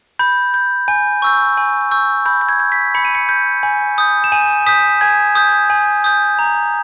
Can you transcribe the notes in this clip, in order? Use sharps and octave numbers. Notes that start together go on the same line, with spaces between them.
B5 G6
G6
G#5 G6
C#6 E6 G6
G#5
C#6 E6 G6
B5 G6
G6
G#6
G6
B6
B5 C#7
D#7
C#7
G6
G#5
D#6 G6
E7
G#5 D#7
D#6 G6 B6
G#5 G#6
D#6 G6
G#5
D#6 G6
A#5